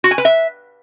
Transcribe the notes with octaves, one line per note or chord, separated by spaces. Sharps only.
F#4
G#5
B4
E5